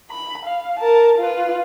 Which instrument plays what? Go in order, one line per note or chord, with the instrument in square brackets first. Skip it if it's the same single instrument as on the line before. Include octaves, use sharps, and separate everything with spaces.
[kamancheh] B5
F5
A#4 A5
F4 B4